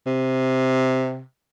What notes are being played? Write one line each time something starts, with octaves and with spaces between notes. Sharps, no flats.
C3